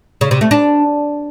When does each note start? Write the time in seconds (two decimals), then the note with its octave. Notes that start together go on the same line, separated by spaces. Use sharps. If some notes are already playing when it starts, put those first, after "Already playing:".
0.21 C#3
0.31 C3
0.41 A3
0.51 D4